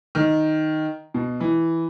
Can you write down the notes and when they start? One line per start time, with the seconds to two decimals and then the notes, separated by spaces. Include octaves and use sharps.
0.15 D#3
1.14 B2
1.40 E3